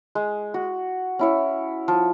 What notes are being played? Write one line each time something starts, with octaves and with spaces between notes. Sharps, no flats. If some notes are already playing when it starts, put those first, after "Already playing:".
G#3
F#4
C#4 E4 C#5
F3